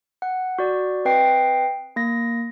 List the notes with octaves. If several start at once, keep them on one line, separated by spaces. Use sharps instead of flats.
F#5
F#4 D5
C4 B4 D#5 G5 C7
A#3 A#6